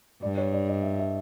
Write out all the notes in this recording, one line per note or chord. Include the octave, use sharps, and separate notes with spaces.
G2 D5
C#5
D5
D#5
E5
E5